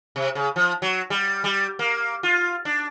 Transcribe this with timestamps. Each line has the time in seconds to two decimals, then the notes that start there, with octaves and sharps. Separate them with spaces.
0.16 C3
0.35 C#3
0.56 F3
0.82 F#3
1.10 G3
1.44 G3
1.79 A#3
2.23 F4
2.65 D4